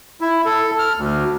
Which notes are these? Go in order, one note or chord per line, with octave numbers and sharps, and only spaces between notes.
E4
A4
F6
D2